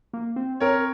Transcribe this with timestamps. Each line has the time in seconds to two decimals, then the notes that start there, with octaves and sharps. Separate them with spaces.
0.13 A#3
0.36 C4
0.60 C4 A#4 C#5